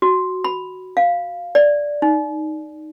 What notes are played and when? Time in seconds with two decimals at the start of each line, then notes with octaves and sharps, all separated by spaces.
0.02 F#4
0.44 B5
0.97 F5
1.55 D5
2.02 D#4